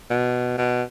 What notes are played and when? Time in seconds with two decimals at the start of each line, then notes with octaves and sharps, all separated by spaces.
0.10 B2
0.58 B2